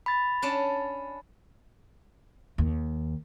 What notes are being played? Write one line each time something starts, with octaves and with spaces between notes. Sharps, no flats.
B5 A6
C#4 D4 A5
D#2